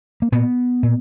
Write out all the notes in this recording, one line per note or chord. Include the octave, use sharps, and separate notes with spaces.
A#3
A#2 B3
A#2